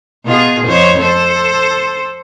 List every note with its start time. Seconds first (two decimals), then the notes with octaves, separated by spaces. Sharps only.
0.25 B2 F4 G#4
0.67 F2 C5 C#5
1.01 A4 C5